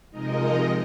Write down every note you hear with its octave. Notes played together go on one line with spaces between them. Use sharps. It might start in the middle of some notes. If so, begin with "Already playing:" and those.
C3 F3 G#3 D#4 A#4 D#5